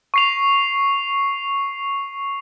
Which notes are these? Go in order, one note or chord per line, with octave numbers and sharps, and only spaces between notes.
C#6 C7 F7